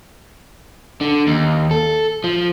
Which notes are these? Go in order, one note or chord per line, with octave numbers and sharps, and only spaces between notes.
D3
D#2
A4
F3